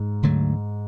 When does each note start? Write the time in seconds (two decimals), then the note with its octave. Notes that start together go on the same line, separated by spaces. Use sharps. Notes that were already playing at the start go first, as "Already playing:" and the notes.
Already playing: G#2
0.23 D2 D3 F#3 A3